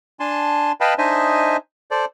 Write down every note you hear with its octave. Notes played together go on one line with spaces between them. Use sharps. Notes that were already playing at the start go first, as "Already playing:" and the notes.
D4 G#5 A5 C6
B4 D#5 F5 G5 A5 B5
D4 D#4 C5 D#5 E5 G#5
A4 C5 D5